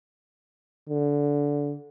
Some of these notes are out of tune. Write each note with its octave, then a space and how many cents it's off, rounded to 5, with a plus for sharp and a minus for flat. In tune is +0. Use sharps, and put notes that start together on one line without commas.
D3 -20